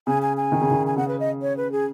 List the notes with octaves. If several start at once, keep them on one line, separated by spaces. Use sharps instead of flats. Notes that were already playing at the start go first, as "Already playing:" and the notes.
C#3 G#5
G#5
G#5
D#3
C#3
D#3
G#5
C#3 F#5
B4
D#5
C#5
B4
G#4